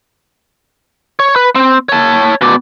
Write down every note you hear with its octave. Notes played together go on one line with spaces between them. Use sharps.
C#5
B4
C4
C#5 A5
B2 D5